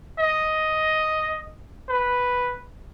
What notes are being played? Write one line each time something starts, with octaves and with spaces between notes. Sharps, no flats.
D#5
B4